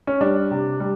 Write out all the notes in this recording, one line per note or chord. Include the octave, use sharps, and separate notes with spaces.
C#4
G3 D4
C3
G3